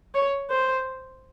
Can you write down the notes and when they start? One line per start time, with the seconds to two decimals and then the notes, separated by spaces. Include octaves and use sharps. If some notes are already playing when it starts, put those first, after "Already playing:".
0.15 C#5
0.50 C5